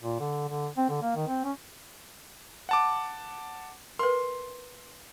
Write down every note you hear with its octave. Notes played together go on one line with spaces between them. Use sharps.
A#2
D3
D3
C4
D3
A#3
D#3
C4
C#4
F#5 A5 D6
A#4 B4 C6